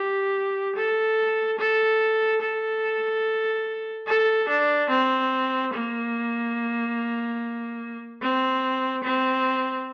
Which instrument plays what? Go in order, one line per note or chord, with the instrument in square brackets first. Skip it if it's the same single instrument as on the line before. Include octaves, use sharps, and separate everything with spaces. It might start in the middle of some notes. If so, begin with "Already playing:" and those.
Already playing: [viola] G4
A4
A4
A4
A4
D4
C4
A#3
C4
C4